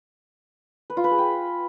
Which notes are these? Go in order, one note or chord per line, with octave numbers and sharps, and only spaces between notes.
B4
F4
B4
G#4
G5